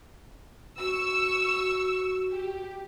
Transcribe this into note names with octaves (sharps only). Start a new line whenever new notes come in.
F#4 C#6 E6
G4